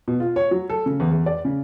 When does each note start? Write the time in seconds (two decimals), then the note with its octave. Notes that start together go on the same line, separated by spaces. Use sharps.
0.08 B2
0.20 F4
0.36 C#5
0.51 F#3
0.69 A4
0.86 C#3
1.00 E2
1.11 E2
1.26 D5
1.45 C#3